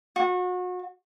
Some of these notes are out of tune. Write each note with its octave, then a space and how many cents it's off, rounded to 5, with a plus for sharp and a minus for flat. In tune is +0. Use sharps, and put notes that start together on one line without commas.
F#4 -35